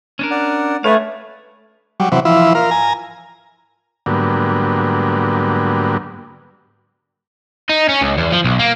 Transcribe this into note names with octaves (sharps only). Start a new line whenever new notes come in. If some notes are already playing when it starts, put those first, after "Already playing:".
C#4 D4 A#4
D5 F#5
A3 G#4 B4 C#5 F5
F#3 G3
C3 E3 F#3
E3 F3 E4
F4 A#4
G#5 A#5
G#2 D3 F#3 G3 A#3 B3
D#4
C#4
C#2
E2
F3
B1
A#3